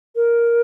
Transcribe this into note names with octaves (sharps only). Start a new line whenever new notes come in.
A#4